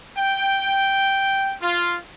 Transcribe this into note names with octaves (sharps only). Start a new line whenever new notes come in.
G5
F4